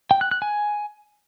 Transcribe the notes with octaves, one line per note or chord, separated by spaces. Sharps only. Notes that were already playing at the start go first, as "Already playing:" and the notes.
G5
F#6
F#6
G#5